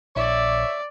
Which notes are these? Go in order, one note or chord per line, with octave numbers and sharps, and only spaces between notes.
A#1 C#5 D5 E5